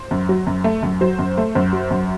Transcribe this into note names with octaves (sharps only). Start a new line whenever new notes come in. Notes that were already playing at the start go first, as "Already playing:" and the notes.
Already playing: C5
F#2
F#3
F#2
A3
F#2
F#3 C5
F#2
A3
F#2 C5
F#3
F#2